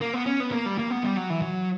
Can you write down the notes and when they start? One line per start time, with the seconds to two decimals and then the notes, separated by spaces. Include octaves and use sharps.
0.01 A#3
0.14 B3
0.26 C#4
0.40 B3
0.52 A#3
0.66 G3
0.78 A#3
0.90 B3
1.03 G3
1.17 F#3
1.30 E3
1.42 F#3